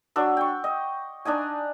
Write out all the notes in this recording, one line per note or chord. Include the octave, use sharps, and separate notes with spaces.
F#3 D4 E6
G5 C#6
D#5
D4 D#4 D#5 G#5